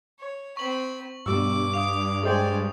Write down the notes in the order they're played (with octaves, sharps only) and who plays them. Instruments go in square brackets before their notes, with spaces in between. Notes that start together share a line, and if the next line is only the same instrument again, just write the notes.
[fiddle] C#5
[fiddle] C4 B5 [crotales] C#6 F#7
[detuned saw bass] G2 [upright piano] B2 G3 E6 [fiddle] D6
[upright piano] F5 [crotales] D#6 F7
[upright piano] G#3 C5 G5 [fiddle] D5 G#5